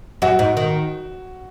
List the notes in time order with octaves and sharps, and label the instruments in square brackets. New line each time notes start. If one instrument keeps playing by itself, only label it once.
[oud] F#2 [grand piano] F#4
[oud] G#2
D#3